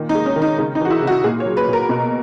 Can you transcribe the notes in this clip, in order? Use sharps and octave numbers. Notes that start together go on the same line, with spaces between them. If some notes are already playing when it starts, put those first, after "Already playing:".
Already playing: A#2 D#3
D#4
G#3
C#4
D#3
D#4
C#3 D#4
D#4
E3 F#4
E4
C#3
F#4
A#2 G#4
C#5
F#3
B4
A#2
A#4
B2